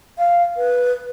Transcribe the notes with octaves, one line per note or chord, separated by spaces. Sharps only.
F5
B4